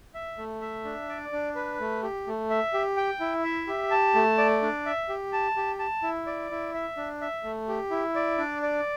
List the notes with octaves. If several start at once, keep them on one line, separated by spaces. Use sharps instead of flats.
E5
A3
E5
D4
D5
D4
B4
A3
G4
A3
E5
G4
G5
E4
E5
G4
A5
A3
D5
D4
E5
G4
A5
G4
A5
E4
D5
E4
E5
D4
E5
A3
G4
E4
D5
D4
D5